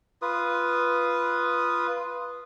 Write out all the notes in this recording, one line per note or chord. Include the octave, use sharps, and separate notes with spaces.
F4 B4 D#6